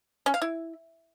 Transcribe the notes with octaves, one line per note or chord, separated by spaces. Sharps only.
C#4
F5
E4